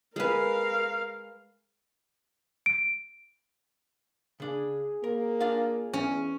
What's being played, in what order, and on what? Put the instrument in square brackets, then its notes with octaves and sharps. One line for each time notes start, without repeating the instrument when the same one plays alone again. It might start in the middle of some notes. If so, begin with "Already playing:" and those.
[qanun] G#3 B4 [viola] A#4 F5
[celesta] D7
[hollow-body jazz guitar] C#3 D4 [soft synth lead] G#4
[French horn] A#3 [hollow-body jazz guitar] A#4
[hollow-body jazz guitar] D4 F4 F5
[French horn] E2 [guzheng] C#4